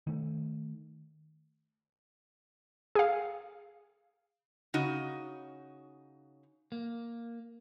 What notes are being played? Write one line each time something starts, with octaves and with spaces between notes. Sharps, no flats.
D#3 A3
G#4 F5
C#3 D#4 F#4
A#3